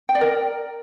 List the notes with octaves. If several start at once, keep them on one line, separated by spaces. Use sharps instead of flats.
G5
D5
A#4